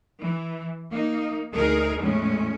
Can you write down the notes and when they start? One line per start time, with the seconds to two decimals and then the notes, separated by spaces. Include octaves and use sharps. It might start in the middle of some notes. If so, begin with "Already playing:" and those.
0.22 E3
0.91 A#3 D#4
1.54 D2 D#4 G#4 A#4
2.00 E2 A2 G#3 C#4